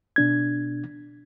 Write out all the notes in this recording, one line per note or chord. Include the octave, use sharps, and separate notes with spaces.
B2 D4 G#6